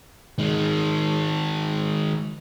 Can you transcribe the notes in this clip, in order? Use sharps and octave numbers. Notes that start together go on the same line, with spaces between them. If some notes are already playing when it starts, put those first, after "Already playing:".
D#3 G#3